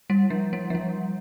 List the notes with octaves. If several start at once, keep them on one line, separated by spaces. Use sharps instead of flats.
G3
F3
G3
F3
G3